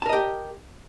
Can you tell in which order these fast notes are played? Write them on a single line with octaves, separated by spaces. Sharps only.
A5 A#4 D#5 G4